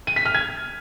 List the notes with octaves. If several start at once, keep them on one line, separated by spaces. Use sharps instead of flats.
D#7
B6
F6
G#6